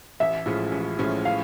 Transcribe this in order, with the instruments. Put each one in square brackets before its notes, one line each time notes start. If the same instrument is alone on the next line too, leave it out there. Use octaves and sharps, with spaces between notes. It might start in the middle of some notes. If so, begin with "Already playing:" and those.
[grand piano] A1 [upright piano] E5
[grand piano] A2 F3 G#3 C#4
A1
A2 F3 G#3 C#4
[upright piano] F5